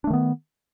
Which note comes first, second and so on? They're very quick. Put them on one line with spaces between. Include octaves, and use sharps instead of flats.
D4 A3 D#3 B3